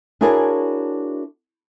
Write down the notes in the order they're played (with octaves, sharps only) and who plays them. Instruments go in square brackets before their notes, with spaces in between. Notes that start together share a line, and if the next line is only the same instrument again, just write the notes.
[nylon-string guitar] D4 E4 F#4 G#4 A#4 C#5